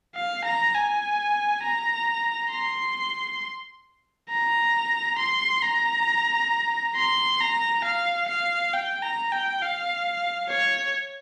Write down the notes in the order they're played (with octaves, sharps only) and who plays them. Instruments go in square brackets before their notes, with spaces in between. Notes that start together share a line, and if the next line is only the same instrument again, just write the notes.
[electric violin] F5
A#5
G#5
A#5
C6
A#5
C6
A#5
C6
A#5
F5
F5
G5
A#5
G5
F5
C#5